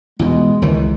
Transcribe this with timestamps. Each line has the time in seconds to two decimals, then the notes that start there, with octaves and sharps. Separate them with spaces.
0.19 E2 B2 G#3
0.62 C#2 D#3 E3